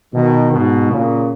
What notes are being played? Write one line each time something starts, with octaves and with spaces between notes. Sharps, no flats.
B2 D#3
G#2 B2
A#2 C#3